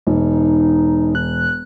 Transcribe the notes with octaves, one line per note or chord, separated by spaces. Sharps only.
E1 D#4
F#6